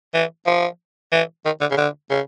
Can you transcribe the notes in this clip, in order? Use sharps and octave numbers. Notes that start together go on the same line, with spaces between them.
E3
F3
E3
D#3
D3
C#3
D3
C#3